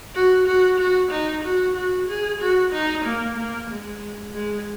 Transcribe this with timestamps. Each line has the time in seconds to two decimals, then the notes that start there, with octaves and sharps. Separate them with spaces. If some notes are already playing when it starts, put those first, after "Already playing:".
0.15 F#4
0.47 F#4
0.79 F#4
1.11 D#4
1.43 F#4
1.76 F#4
2.08 G#4
2.41 F#4
2.72 D#4
3.05 A#3
3.37 A#3
3.70 G#3
4.34 G#3